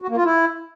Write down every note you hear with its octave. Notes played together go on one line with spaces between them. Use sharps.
F#4
A#3
F4
E4